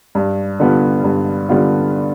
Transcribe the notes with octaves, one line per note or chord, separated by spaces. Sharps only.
G2
D3 G3 B3 F4
G2
D3 G3 B3 F4